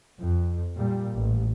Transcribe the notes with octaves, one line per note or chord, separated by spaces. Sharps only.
F2
A#2 G3
A1